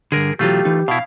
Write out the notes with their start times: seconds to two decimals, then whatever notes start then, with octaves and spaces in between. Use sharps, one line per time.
0.12 G2 D3 G#4 A#4
0.39 B2 E3 F#3 A3 F4 G4
0.65 E3 D#4
0.88 B2 E4 F5